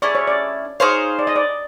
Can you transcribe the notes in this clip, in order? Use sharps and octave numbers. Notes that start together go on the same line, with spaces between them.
A3 C#4 E4 G#4 D5
C#5
D5
D#4 G#4 C5 C#5 F5
D5
D#5
D5